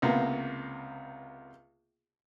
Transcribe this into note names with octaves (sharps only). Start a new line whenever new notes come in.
C#2 C3 A#3 B3